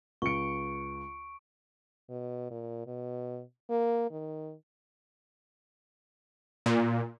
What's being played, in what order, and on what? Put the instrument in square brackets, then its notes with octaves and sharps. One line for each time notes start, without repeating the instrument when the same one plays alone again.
[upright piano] C#2 C#7 [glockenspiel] C#6 D7
[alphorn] B2
A#2
B2
A#3
D#3
[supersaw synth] A#2